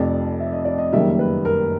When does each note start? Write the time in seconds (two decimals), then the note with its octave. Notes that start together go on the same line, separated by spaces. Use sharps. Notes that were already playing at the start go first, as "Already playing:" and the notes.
Already playing: F1 F2 C3 D5
0.40 E5
0.53 D#5
0.65 D5
0.78 D#5
0.93 F#1 F#2 D#3 G3 A#3 E5
1.19 B4
1.45 A#4